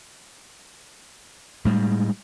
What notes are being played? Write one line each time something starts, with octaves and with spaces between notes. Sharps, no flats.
A2 G3 G#3